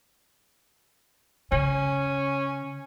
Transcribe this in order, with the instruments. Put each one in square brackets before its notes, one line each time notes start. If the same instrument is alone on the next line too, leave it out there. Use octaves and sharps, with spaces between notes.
[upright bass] C#3 [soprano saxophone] C#4